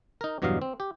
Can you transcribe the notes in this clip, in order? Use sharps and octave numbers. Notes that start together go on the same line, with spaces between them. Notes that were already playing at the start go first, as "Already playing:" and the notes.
D#4 A#4
E2 G2 B2 F#3 D#5 F5
C4
G4